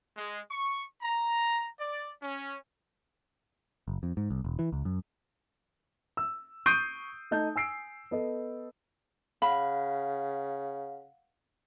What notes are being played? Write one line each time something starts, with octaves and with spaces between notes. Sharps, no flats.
G#3
C#6
A#5
D5
C#4
F#1
F2
G#2
C2
E1
E3
C#2
F#2
E6
C#6 D#6 G6 C7 D7 D#7
A3 D#4 A5 G6
G#5 E6 C7 D7
B3 A4 D#5
C#3 F5 F#5 B5